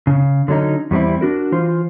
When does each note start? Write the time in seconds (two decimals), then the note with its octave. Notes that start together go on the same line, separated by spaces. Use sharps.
0.07 C#3
0.48 D3 F#3 C#4 D#4
0.91 E2 G3 B3 C4 E4
1.21 D4 F#4 A#4
1.52 E3 F4 C5